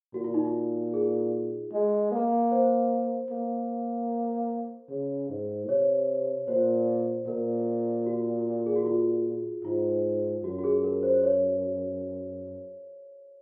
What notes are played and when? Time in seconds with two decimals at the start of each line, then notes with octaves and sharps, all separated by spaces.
0.14 A#2 F#4
0.24 F4
0.34 D#4
0.45 F4
0.94 G#4
1.73 G#3
2.12 A#3
2.52 C5
3.31 A#3
4.90 C#3
5.30 G#2
5.69 C3 C#5
6.48 A#2 C5
7.27 A#2 A#4
8.06 F#4
8.66 G#4
8.76 F#4
8.86 F4
9.65 G#2 F4
10.44 F#2 F#4
10.59 F#4
10.64 G#4
10.84 A#4
11.03 C5
11.24 C#5